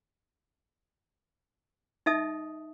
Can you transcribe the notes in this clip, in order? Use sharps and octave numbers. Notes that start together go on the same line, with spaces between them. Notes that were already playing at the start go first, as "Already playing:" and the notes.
D#4 D#5 E5 A5 D#6